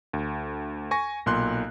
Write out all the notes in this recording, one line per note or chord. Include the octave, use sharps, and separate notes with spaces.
D2
G#5 C#6 A#6
B1 A#2 C6 F#6